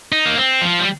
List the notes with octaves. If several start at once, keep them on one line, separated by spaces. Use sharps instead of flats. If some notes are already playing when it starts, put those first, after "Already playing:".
D#4
A#3
C4
F3
G3